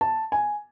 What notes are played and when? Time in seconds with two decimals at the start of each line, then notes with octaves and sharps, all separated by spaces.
0.01 A5
0.32 G#5